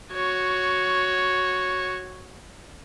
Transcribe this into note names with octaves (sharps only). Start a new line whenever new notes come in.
F#4 C#5